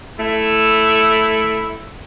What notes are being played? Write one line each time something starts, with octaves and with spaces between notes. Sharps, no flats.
A3 E4